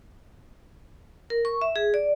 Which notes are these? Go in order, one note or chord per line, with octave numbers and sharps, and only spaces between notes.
A#4
C#6
E5
G#4
D5